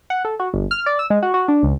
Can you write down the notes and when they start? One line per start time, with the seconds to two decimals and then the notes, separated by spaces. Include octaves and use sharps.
0.10 F#5
0.25 A4
0.40 F#4
0.54 G1
0.71 F6
0.86 D5
0.99 E6
1.10 G#3
1.23 F#4
1.34 F#4
1.48 D4
1.63 C#2